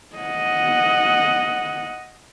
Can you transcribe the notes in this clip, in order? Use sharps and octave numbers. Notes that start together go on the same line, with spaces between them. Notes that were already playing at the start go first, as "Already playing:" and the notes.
D#5 F#5